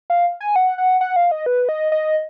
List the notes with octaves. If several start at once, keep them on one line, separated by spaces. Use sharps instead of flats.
F5
G#5
F#5
F#5
F#5
F5
D#5
B4
D#5
D#5